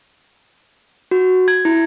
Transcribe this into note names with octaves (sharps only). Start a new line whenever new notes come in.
F#4
G#6
E4